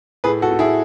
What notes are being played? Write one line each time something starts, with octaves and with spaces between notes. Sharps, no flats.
A2 G#4 B4
F#4 A4
A2
E4 G#4